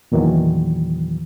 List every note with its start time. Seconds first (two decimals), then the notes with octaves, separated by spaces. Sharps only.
0.12 E2 A#2 D#3 E3 F#3